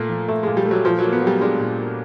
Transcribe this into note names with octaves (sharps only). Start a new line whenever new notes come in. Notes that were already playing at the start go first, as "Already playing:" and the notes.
Already playing: A#2 A3 A#3
F3
A#2 A3
A#2 G#3
G3
A3
F#3
A#2 F3
F#3 A#3
B3
F#3
G3
G#3 D4
A#2
A#3